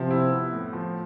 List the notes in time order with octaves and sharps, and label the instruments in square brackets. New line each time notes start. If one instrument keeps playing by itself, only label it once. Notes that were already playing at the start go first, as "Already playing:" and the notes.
Already playing: [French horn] C3 [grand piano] F3
[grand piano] E4
B3
A2
F3